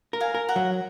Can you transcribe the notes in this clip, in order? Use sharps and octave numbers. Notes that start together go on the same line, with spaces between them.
A#4
F5 G#5
A#4
F#5 A#5
F#3